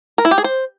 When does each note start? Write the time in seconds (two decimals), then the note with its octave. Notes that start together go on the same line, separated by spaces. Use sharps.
0.18 A#4
0.25 E4
0.31 G4
0.38 G#4
0.44 C5